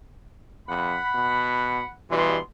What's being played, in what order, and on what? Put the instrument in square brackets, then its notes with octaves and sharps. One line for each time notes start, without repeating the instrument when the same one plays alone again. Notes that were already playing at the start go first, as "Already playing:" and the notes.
[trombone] F2 [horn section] F#5 B5
[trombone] B2
[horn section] G2 B2 C6 [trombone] E3